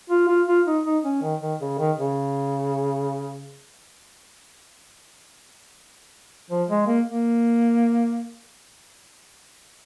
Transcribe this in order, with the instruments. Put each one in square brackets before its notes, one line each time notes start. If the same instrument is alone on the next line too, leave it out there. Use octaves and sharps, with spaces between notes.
[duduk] F4
F4
F4
D#4
D#4
C#4
D#3
D#3
C#3
D#3
C#3
F3
G#3
A#3
A#3